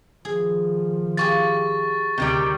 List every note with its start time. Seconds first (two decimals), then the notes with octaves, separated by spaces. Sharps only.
0.25 D#3 F3 G#4
1.17 F4 G4 G#4 C#6 A6
2.18 D2 C3 D#3 G3